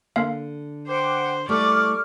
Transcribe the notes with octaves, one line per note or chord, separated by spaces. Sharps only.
D3 A#3 F5
C5 F#5 G5 D6
G3 A3 E4 D5 C#6 D6 F6